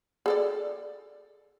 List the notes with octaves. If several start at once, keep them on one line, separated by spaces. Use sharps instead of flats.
G#4 A4 D5